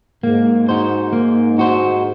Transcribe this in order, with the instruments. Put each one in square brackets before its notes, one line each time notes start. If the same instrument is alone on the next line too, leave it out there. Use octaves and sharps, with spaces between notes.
[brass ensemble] G#2 [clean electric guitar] A#3
[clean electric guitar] D#4 F#4 C5
A#3
D#4 F#4 C5